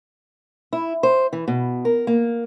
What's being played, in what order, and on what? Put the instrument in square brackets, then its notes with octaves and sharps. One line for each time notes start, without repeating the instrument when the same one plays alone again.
[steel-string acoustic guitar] E4
C5
E3
B2
A#4
A#3